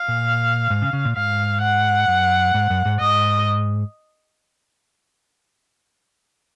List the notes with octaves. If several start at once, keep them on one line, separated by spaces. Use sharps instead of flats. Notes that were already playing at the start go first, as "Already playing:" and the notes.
Already playing: F5
A#2
G#2
C#3
C#3
A#2
G#2 F5
F#5
F#2
G#2
F#2
G#2
G#2 D#5